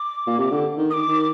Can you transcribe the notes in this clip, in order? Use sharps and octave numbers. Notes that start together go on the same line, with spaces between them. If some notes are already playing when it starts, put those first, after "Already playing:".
Already playing: D6
A#2
C3
D3
D#3
D#6
D6
D#3